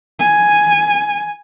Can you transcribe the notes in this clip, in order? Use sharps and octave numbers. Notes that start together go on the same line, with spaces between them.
G#5